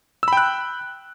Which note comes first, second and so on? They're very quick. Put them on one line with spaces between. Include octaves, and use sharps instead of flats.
E6 B5 G5 F#6